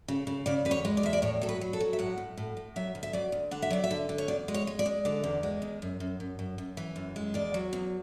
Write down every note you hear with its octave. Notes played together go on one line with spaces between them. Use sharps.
C#3
C#3
C#3 D5
E2 B4
C#5
G#3
D5
E2 E5
D5
A2 C#5
F#3 A4
B4
F#3
A4
F#3
E5
A2 F#5
A2
A2
A2
F#3 E5
D2
E5
F#3 D5
D2
D3 F#5
E5
F#3 D5
E5
D3
D3
C#5
E2 D5
G#3
C#5
G#3
D5
G#3
D3 D5
E2
G#3
E2
F#2
F#2
F#2
F#2
F#2
E3
F#2
G#3
E2 D5
F#3
E2